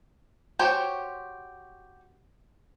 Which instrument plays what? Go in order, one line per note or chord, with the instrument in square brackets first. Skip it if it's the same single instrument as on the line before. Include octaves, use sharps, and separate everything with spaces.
[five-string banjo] F#4 G4 C5 C#5 G5